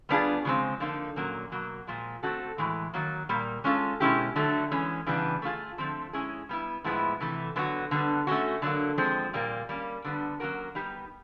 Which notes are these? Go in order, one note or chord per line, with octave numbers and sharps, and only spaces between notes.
G3 B3 D4 F4 G#4
C#3 F3 G#3 C4
D3 F3 A#3 D#4
A#2 F#3 A#3 C#4
B2 F#3 A#3
A#2 F3 G#3
A3 C4 D#4 F#4 A4
A2 E3 G#3
D#3 F#3 A#3
A#2 G3 A#3
G#3 C#4 F4 A4
B2 G#3 C#4 E4 G4
D3 F#3 A3
E3 G#3 C#4
C#3 E3 G3 B3 D4
A3 C#4 F4 G#4
D3 F3 A3 C4
G#3 C#4 E4 G#4
G3 B3 E4
A2 F3 G#3 B3 E4
C3 E3 A3
D3 F#3 B3 D4 F#4
D3 G3 B3
A3 C#4 F#4
D3 F#3 A#3
F3 G#3 C4
A#2 G3 A#3
G3 A#3 C#4
D3 G3 B3
F#3 A#3 C#4 F#4 A#4
G3 B3 D#4 G4